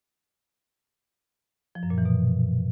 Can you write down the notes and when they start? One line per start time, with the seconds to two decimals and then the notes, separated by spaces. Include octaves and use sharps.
1.75 F3
1.83 F#2
1.90 A#2
1.98 E3
2.05 B2